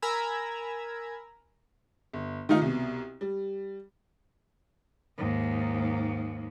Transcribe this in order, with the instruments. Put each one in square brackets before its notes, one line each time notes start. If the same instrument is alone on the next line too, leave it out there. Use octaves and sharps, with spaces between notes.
[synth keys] A#4 G#5 A#5 B5 E6 G#6
[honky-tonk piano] G1
D#3 A3 D#4 F4
C2 B2
G3
[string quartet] D#2 G#2